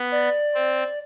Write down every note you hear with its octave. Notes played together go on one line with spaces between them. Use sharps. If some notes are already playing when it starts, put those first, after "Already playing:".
Already playing: B3
D5
C4